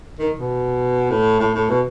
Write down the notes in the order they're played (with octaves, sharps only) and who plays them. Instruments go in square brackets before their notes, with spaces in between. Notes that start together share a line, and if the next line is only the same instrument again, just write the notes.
[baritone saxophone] D#3
B2
A2
A2
A2
B2